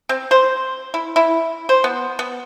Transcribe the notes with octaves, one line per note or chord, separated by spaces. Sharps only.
C4
C5
E4
E4
C5
B3
B3